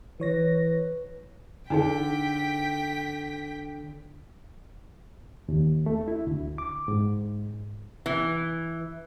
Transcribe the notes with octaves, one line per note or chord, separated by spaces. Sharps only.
E3 B4 C#5 A#6
D3 D4 D#4 G#4 G5 B6
D#2
A3
E4
D2
D6
G#2
E3